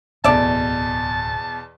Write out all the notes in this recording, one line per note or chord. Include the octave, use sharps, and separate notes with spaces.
D1 E2 B2 A4 D5 E5 A5